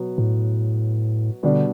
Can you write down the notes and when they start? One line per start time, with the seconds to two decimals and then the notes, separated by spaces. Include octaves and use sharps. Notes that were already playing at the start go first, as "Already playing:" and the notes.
Already playing: B2 F#3 B3
0.18 A2
1.43 B2 D3 G3 D4